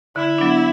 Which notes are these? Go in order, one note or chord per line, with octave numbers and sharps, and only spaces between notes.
D3 E4
F#3 B3 D4